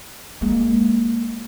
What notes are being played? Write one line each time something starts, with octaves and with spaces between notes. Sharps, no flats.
G#3 A#3